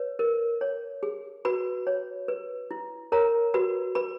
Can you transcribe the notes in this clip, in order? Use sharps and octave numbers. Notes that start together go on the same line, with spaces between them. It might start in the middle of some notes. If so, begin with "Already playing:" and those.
Already playing: B4 C#5
A#4
C#5
G#4
F#4 B4 B5
C#5
B4
E4
A#4 C#5 A#5
F#4 B4 B5
B4 B5